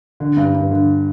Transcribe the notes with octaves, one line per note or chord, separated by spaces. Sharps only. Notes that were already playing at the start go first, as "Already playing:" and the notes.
D3
G2
G2
D3